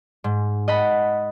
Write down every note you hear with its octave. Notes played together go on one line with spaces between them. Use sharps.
G#2
D#5 F#5 A5 B5